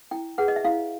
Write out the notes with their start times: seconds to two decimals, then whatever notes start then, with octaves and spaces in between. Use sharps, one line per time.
0.11 E4 G5
0.38 G#4 B4 F#5
0.48 D#5
0.56 E5
0.64 E4 F5